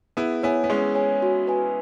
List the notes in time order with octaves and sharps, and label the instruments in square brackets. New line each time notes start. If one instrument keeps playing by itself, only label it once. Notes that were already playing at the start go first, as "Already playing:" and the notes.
[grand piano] B3 E4 [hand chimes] G#4
[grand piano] B3 E4 [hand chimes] C#5 G#5
[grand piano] B3
[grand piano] G#3 C#4 [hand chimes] G#4
[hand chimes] C#5 G#5
F#4
B4 G#5